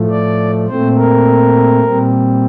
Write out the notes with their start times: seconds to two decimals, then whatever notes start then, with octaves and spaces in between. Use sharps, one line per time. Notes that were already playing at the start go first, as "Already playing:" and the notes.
Already playing: A2 F3 A3
0.10 D5
0.68 A#2 A3 C4 C5
0.97 A#4
1.84 A#2 G3 C4